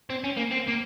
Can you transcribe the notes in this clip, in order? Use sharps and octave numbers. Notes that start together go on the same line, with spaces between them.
C4
C#4
A#3
C4
A#3